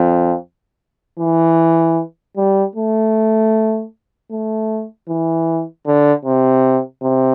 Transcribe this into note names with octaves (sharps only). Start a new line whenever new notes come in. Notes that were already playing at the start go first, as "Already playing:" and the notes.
Already playing: F2
E3
G3
A3
A3
E3
D3
C3
C3